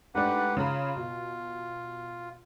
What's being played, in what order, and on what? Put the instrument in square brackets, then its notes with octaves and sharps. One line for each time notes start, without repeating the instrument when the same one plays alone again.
[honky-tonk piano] G#2 A3 D4 [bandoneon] G4 B4 F#5
[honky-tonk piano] C#3 A#5 B5 [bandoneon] F4
[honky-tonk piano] B2